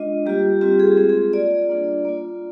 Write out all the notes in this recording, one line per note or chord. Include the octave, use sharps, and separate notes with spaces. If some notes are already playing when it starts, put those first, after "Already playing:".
Already playing: G#3 D4 F4 D#5
G3 A#3 F4 G4
G3 C4 F4 G4
G#4
G#3 C4 F4 G#4
G#4
A#3 F4 D5
G3 A#3 D4 F4
A#3 F4